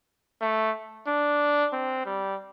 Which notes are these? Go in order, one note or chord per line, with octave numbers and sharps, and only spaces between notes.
A3
D4
C4
G3